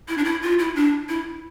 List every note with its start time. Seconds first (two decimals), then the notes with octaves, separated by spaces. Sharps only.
0.08 E4
0.18 D4
0.24 E4
0.42 F4
0.59 E4
0.75 D4
1.09 E4